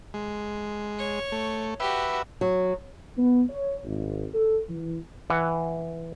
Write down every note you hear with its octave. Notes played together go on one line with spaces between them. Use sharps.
G#3
C#5
A3
F#4 G4 B4 E5
F#3
B3
C#5
G#1
A4
E3
E3 F#5